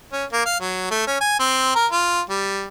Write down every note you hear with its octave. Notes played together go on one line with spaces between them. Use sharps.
C#4
A#3
F5
F#3
A3
C#4
G#5
C4
A#4
F4
G3